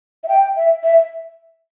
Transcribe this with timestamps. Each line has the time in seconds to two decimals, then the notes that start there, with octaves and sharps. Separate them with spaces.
0.24 E5
0.28 G5
0.56 E5
0.83 E5